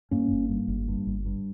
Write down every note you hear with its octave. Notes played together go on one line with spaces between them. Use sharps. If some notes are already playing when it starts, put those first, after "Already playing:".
G2 A#3 C#4
G1
G2
G1
G2
G1
G2